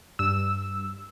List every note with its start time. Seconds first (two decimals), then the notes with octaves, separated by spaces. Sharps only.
0.19 G2 E6